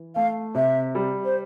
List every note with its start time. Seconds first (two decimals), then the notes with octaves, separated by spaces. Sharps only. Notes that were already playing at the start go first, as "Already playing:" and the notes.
Already playing: E3
0.15 A3 F5
0.55 C3 E5
0.95 G3
1.25 C5